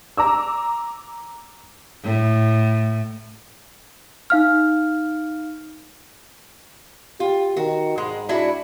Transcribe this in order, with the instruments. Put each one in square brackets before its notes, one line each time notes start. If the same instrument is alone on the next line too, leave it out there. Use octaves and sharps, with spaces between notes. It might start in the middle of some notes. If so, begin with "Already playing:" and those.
[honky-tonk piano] A#5 D6 E6
[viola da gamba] A2
[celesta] D#4 F5 F6
[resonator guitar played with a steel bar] F4 [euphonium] G4
[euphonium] D#3 [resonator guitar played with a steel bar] F#4
[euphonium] G#2 [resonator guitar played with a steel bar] G#3
[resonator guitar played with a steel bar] D4 E4 F#4